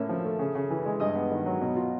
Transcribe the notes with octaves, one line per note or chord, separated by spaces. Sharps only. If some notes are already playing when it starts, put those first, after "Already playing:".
Already playing: A2 A#3 C#4 E5
F3
A3
C#3
C#3
E3
G#3
G2 D#5 D#6
B3
D#3
F#3
B2
F4